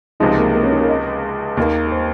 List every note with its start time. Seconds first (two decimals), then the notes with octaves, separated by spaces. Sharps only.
0.20 C#2 C3 F3 G#3 D#4
0.37 A#3
0.54 A#3
0.63 C#4
0.72 D#4
0.80 A#4
0.89 D#5
1.57 D#2 D#3 A#3
1.87 A#4
1.92 C5